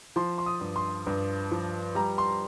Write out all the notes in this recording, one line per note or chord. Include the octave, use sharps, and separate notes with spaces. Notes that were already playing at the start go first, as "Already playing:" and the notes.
F3 C6
C6
D#6
G2
C6
G2
F3
G3 A#5
C6